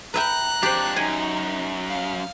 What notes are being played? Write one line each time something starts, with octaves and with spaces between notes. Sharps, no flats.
B4 E5 G5 A#5 F#6
F2 D4 G4 C5
F#2 D#4 G#5
F5